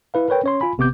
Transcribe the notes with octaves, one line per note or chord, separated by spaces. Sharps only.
E4 B4 F5
A#4 B4 C#5 G5
C#4 C#5 C6
F4 G#5 B5
G#1 C3 B3 D6 G6